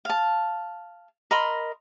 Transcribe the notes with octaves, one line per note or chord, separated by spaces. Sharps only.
F5 A5
A#4 D#5 B5 C6